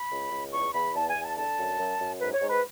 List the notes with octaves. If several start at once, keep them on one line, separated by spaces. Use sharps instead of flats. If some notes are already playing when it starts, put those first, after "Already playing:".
Already playing: B5
C#2
C#2
E2 C#6
E2 B5
E2 A5
G#5
E2
A5
D3 A5
F#2
F#2
F#2
G#2 B4
C#5
G#2
B4